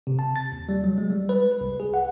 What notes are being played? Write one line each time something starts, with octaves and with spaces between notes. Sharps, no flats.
C3
A5
A6
D#2
G3
F#3
G#3
G3
B4
C2
G#4
F#5